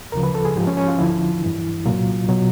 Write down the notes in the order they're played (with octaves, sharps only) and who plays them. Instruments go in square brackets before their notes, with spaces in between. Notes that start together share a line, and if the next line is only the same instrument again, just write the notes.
[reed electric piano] D2 C#3 F3 A#4
B4
A4
G#4
G#2 F3 G4
C#4
C#4
F4
D2 D3 F3 E4
G2 E3
C2 A#2 F#3 F4
B2 F#3